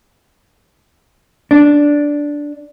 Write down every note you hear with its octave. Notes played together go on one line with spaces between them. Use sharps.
D4